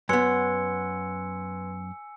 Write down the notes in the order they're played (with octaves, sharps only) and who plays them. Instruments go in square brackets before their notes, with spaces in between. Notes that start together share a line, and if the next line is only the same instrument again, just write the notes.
[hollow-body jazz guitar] F#2 B3 [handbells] B4 C6 G#6 [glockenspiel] G#5 E6 C#7